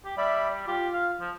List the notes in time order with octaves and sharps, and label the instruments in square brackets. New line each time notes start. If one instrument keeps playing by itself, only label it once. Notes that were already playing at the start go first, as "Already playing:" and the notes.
[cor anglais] G4
[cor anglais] G3 [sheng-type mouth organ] D5 E5 B5
[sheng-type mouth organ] F4 [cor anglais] G4
[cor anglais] F5
F3